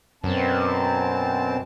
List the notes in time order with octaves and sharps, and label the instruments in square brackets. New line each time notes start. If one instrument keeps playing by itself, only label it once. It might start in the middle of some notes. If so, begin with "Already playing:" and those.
[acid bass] F#2 [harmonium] B2 C4 A5